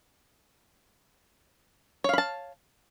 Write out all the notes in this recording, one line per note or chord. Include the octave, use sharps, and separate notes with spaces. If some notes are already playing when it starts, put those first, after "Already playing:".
C#5 F5 A5 B5